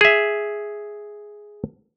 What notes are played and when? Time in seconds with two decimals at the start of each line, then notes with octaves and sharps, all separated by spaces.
0.01 G#4 E5